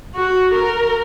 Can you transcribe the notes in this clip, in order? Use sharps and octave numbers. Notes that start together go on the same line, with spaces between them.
F#4
A#4